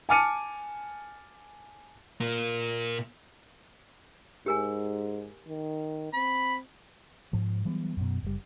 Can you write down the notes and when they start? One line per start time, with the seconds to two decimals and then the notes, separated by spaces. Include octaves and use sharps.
0.09 G#5 A5 D6 F6 C#7 D#7
2.20 A#2 A#3
4.46 G#2 G4 A#4 G#5
5.48 D#3
6.13 C4 B5
7.33 G#2 F3
7.65 E3 F#3 G3 B3
7.97 F#2 B2
8.23 F#1 G3